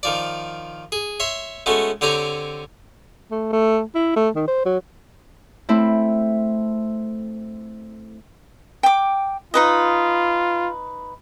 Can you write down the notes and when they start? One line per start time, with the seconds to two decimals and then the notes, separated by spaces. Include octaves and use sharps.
0.03 D#3 F3 D5
0.92 G#4
1.20 C#5 E5 C6
1.66 G#3 A3 B3 C#4 F#4
2.01 D3 C4 G4 C#5 G#5 A#5
3.31 A3
3.53 A3
3.95 E4
4.16 A3
4.36 D#3
4.48 C5
4.66 F#3
5.69 A3 C4 E4
8.83 G5 D6
9.54 D#4 F4 B4 D#5